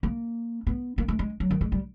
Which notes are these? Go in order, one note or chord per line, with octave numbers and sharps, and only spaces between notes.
A#3
B3
A#3
A3
G#3
F#3
D#3
G#3
G3